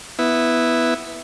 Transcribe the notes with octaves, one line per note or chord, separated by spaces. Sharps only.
B3 E4